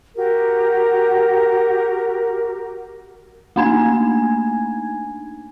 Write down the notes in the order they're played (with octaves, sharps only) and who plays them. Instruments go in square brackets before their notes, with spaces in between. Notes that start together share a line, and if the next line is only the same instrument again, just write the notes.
[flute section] F#4 G4 A#4
[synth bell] A3 A#3 D4 D#4 G#5 G#6